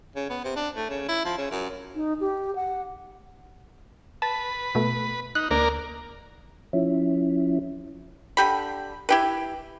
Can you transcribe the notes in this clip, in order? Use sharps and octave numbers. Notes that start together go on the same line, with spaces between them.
C#3
B3
C3
D4
A3
C#3
E4
F3
C#3
F#2
D#4
G4
F#5
B4 A5
B2 A3
D#4 F#6
D2 A#3 A#4 D5
F3 C#4 E4
D3 G4 B5
E4 G4 B4